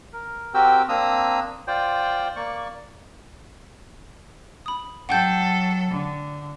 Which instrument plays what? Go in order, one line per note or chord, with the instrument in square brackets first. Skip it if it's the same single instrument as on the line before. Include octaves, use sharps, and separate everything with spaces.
[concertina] A#4
C4 F#4 G4 A#4 G5 E6
A#3 C4 D4 A#5 D#6 E6
F4 C5 D5 G5
A#3 D5 C#6
[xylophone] B5 D#6
[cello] F#3 A4 [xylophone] F#5 G5 G6
[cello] D3